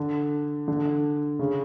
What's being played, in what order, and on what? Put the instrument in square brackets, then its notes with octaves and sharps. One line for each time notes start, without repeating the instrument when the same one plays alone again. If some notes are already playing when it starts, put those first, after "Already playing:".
Already playing: [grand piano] D3
D3
C#3